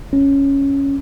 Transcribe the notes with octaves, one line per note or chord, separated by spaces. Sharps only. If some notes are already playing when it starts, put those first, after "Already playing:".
C#4